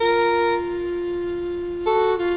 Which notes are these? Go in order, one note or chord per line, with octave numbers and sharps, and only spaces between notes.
F4 A#4
F#4 A4
F4